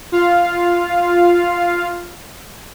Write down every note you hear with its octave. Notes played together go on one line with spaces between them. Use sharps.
F4 F5